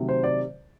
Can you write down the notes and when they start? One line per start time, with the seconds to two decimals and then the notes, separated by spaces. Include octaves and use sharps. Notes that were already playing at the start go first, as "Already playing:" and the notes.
Already playing: C3 D#3 F#3 A3
0.09 C5
0.24 D5